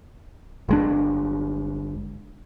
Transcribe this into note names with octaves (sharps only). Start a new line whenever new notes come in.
G1 G#3 D4